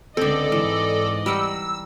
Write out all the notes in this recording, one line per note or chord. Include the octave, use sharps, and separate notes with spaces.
C#2 D3 G#3 C4 A4 D5 D#5
G#2 E3
G3 A#4 F#5 E6